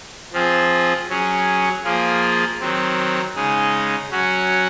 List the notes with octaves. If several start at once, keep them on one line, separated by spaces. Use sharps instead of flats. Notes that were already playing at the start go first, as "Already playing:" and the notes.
F3 C4 F4 G#4
F#3 C#4 G#4
F3 A#3 F4 G#4
D#3 F#3 C4
C#3 G#3 D#4 G#4
F#3 C#4 F#4